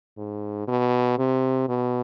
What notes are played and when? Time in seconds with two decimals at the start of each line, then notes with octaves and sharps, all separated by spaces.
0.18 G#2
0.68 B2
1.18 C3
1.69 B2